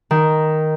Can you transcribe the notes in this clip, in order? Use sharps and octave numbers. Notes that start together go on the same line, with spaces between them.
D#3